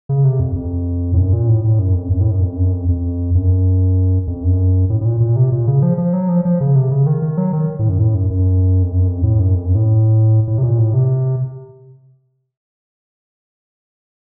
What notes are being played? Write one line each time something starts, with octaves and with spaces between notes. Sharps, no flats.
C#3
C3
F2
F2
A2
F#2
A#2
A2
A2
F#2
F2
F#2
A2
F#2
F2
F#2
F2
F2
F#2
F2
F#2
A2
A2
A#2
A#2
C3
A#2
C#3
F3
F3
F#3
F3
F3
C#3
C3
C#3
D#3
D#3
F#3
D#3
A2
F#2
A2
F#2
F#2
F2
F#2
F2
A2
F#2
F2
F#2
A2
A2
C3
A#2
A2
C3